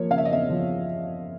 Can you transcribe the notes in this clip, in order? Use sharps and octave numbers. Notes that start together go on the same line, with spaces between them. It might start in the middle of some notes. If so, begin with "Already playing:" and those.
Already playing: F3 A#3 C#5
C#3 F5
E5
D#5
E2 E5
F3